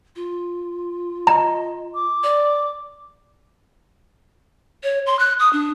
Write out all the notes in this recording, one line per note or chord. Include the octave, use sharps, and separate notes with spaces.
F4
D#5 A#5
D6
D5
C#5
C6
F#6
D#6
D4